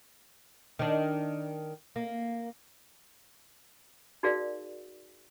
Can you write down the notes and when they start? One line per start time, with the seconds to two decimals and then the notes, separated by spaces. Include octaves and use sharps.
0.79 D#3 D4
1.96 A#3
4.23 D#4 F#4 G#4 A#4 D5 F5